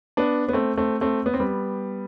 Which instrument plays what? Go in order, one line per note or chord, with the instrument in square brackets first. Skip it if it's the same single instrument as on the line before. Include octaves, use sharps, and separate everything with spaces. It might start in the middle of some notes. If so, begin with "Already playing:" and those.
[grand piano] B3 D4
B3
A3 C4
A3 C4
A3 C4
B3
C4
G3 B3